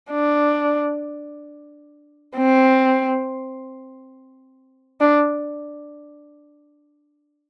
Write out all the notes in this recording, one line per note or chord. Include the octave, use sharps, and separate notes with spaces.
D4
C4
D4